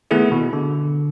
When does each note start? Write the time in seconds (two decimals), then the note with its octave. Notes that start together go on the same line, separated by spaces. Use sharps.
0.11 D#3 A3 B3 E4 G#4 A4
0.31 B2
0.53 D3